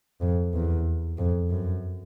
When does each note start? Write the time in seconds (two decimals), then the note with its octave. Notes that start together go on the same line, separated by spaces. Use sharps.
0.21 F2
0.54 E2
1.18 F2
1.50 F#2